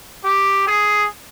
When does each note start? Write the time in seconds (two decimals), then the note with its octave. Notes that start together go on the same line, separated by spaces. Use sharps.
0.25 G4
0.67 G#4